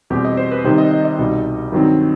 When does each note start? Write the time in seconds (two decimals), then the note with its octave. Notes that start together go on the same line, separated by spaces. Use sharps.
0.10 E2 B2 G3 C4 G4
0.25 D#5
0.37 C5
0.51 B4
0.64 C3 D#3 G3 D#4 C5
0.78 D#5
0.91 D#5
1.05 D#5
1.18 C2 B2 G3 D#4
1.72 G2 D#3 F#3 C4 D#4